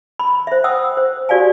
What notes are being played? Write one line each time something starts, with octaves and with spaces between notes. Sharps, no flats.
B5
C5 E5
F#5 G5 D#6 E6
C5
F#4 G4 D5 F5 G#5